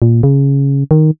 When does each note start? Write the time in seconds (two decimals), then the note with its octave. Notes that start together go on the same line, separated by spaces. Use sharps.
0.02 A#2
0.23 C#3
0.91 D#3